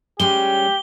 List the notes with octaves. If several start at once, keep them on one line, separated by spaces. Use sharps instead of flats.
G3 G#3 C#4 G4 G7